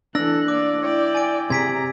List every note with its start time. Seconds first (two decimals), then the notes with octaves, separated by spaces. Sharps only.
0.15 E3 D4 A4 E6 F#6 A#6
0.48 A#3 D5 D6
0.82 E4 D5 G5
1.15 G#5 A6 D7
1.50 C3 G#4 A#5 G#6 B6 D7